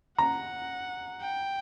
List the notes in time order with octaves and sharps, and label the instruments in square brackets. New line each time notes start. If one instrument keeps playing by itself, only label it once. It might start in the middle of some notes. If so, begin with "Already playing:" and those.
[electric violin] F#5 [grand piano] A#5
[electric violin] G5